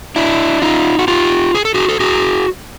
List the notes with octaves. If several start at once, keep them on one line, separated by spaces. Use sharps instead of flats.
D4 E4
D#4 F4
F#4
F4 G4
G#4
A4
F#4 G#4
A4
F#4 G#4